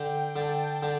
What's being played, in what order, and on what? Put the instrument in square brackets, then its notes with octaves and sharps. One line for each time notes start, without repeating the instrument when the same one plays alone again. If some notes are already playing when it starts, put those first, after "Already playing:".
Already playing: [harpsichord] D3 [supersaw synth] G5
[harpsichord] D3 [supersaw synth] A5
[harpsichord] D3